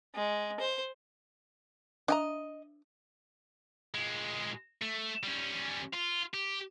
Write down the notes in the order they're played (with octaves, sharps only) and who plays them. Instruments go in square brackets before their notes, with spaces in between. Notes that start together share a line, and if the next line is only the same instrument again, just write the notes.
[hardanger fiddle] G#3
C5
[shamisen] D4 G5 A#5 [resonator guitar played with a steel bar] D#5
[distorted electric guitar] A#2 G#3
A3
G3 C#4
F4
G4